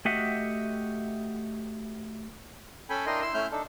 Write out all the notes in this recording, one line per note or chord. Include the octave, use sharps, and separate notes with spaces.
A3 F#4 G4 D#5 E5 F#5
C#4 A4 G5 G#5 B5
D4 E4 A#4 D#5 G5 C6
E4 C6 E6
A3 C#4 E4 E5 F6 G6
D4 D#4 A4